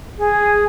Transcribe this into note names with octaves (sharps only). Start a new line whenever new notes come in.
G#4